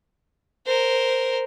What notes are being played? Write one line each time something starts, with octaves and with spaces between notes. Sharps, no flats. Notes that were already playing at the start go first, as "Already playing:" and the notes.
A#4 C5